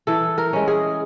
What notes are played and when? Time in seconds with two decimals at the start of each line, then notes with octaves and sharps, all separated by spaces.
0.07 E3 A4
0.38 A#4
0.53 G#3 C#4
0.68 G#4